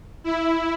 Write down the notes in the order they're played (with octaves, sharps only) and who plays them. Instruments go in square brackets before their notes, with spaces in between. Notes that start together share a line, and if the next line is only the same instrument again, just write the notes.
[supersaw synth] E4